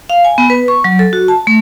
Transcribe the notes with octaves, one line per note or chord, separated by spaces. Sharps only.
F5
G#5
B3
B4
C#6
F#3
A4
F#4
A5
A3